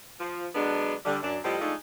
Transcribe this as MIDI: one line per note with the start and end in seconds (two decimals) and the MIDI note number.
0.20 0.47 53
0.55 0.95 50
0.55 0.95 54
0.55 0.95 56
0.55 0.95 59
0.55 0.95 62
1.06 1.18 50
1.06 1.18 55
1.23 1.38 42
1.23 1.38 62
1.44 1.57 45
1.44 1.57 53
1.44 1.57 55
1.44 1.57 60
1.44 1.57 67
1.44 1.57 75
1.60 1.73 53
1.60 1.73 56
1.60 1.73 57
1.60 1.73 62
1.60 1.73 63